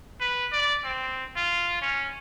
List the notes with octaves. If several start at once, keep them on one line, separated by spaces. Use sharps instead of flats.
B4
D5
C4
F4
C#4